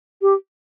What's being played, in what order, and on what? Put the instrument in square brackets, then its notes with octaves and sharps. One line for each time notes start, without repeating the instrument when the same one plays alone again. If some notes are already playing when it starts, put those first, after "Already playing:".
[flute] G4